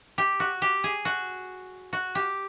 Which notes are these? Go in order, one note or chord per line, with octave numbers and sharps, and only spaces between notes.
G4
F#4
G4
G#4
F#4
F#4
G4